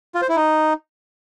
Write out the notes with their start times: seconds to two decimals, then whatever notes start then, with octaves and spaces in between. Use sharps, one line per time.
0.15 F4
0.22 C5
0.29 E4
0.36 D#4